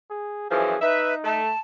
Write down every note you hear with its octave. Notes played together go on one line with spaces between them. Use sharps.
G#4
F#2 E3 F3 G#4
D#4 B4 E5
A3 A5